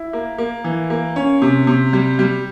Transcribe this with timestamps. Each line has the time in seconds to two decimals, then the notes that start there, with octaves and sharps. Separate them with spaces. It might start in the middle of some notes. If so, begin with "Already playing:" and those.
Already playing: E4
0.13 A#3
0.38 A#3
0.64 E3
0.90 A#3
1.16 C#4
1.42 C3
1.67 C3
1.93 G3
2.19 G3